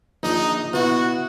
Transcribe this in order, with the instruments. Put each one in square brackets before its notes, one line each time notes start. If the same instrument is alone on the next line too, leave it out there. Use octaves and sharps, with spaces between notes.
[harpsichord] A#1 D4 D#6 [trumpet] D#4
[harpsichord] B2 E4 [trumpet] F#4